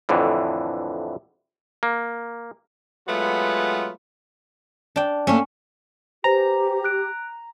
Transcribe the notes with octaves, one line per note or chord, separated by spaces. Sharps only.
F2 A2 D3 E3
A#3
F#3 G#3 A3 B3 F4 B4
D4 G5
A3 A#3 C#4
G4 B4 C5 G#5 A#5
F#6 D7